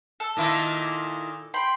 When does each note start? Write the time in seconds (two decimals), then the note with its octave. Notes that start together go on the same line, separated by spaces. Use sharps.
0.20 A4
0.37 A#2 D#3 E4
1.54 G5 B5 C6